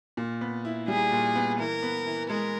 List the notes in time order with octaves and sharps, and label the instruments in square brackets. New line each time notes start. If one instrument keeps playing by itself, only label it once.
[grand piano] A#2
B3
E4
[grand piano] G3 [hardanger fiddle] G#4
[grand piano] A#2
B3
[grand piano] E3 [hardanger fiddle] A#4
[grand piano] B3
E3
[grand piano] G#3 [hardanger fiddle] A#4